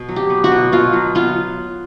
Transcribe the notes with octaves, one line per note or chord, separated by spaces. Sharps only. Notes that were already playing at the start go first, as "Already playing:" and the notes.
Already playing: B2
F#3
G4
B3
F#4
B2
B2 F4
F#3
B3 F4